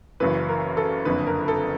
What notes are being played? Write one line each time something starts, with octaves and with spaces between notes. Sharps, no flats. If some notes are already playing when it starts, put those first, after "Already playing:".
F#1 F#2 C#3 E3 B4
A#4
A4
F#1 F2 D3 B4
A#4
A4